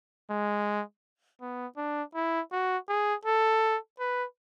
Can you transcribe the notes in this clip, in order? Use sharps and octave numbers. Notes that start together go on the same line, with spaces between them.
G#3
B3
D4
E4
F#4
G#4
A4
B4